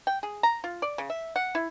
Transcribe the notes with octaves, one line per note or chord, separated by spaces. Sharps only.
G5
G#4
A#5
F4
D5
C#3
E5
F#5
E4